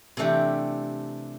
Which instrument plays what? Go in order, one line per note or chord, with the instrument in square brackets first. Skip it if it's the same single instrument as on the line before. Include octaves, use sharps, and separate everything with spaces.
[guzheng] C3 E3 A3 D4 G4